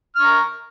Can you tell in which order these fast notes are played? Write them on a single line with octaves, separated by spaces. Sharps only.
F6 C#6 A#5